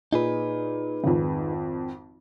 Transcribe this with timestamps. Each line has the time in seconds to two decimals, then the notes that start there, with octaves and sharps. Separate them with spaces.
0.13 A#2 D#4 G#4 B4
1.04 G#1 F2